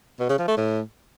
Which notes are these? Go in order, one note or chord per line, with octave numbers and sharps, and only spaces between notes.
B2
C#3
F3
A3
A2